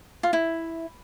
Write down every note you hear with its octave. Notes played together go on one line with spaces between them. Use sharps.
F4
E4